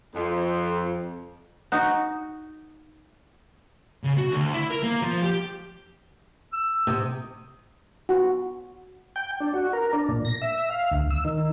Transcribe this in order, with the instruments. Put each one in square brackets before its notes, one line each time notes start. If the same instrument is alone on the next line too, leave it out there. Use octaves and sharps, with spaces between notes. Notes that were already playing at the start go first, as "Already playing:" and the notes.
[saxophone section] F2
[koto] D#4 F#4
[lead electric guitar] C#3
F#4
D2
E4
A#4
A#3
F3
G4
[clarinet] E6
[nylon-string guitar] C3 [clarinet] D#6
[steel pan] F#4
[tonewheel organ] G5
D4
F#4
A#4
D4
A#2
A#6
E5
F5
D2
E6
D#3